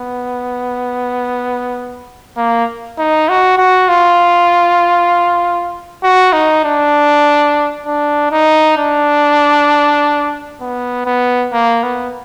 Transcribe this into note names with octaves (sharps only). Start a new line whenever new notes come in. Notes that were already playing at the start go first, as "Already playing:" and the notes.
Already playing: B3
A#3
D#4
F#4
F#4
F4
F#4
D#4
D4
D4
D#4
D4
B3
B3
A#3
B3